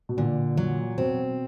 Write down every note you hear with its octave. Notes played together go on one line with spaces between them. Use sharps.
B2
A#2 D3
F#3
B2 C4